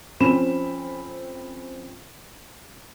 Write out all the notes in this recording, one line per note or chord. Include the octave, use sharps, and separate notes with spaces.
F2 C4 C#4 B5 E7